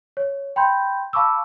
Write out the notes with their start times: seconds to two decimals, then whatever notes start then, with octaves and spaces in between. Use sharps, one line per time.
0.17 C#5
0.56 G5 B5 C6 G6
1.13 F5 A5 B5 C#6 D6 E6